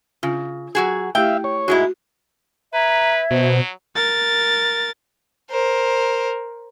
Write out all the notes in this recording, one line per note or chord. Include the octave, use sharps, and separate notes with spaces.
C#3 F4
F#3 F#4 G#4
A3 E4 G4 E5 F5 G5
C#5
G#2 G#3 E4 F#4
B4 E5 A#5 G#6
B2 F#3 C5
A#4 A6
A#4 C5